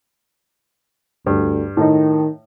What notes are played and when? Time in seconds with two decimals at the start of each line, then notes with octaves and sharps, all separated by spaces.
1.26 D2 G2
1.77 A2 D#3 D#4